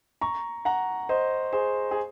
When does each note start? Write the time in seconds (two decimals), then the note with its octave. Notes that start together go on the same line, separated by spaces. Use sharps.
0.21 A#5 C#6
0.65 F#5 A#5
1.09 C5 D#5
1.53 G#4 C5
1.91 G#4